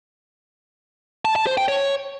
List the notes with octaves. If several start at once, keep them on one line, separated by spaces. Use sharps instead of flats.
A5
A5
C5
G5
C#5